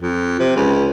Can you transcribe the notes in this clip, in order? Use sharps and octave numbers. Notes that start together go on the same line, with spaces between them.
F2
C3
C#2